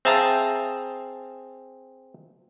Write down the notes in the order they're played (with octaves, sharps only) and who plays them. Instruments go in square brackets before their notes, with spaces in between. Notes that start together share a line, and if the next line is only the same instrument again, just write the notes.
[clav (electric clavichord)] C4 G#4 E5 F5 A5 A#5